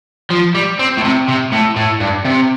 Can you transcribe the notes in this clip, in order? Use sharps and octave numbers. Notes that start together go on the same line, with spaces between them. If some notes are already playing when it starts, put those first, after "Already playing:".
F3
G3
C4
A2
C3
C3
A2
A2
G2
C3